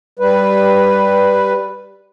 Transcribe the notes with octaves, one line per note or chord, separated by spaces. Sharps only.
G3 B4